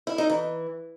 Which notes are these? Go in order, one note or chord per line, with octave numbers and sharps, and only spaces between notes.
E4
D#4
E3